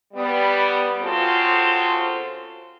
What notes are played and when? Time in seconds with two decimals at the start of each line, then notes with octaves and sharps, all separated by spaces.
0.14 G3 B3
1.01 C#3 C4 F4 F#4 A4 C5